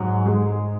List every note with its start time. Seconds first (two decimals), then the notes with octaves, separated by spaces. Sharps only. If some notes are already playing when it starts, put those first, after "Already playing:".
Already playing: G#2 F#3
0.26 G#3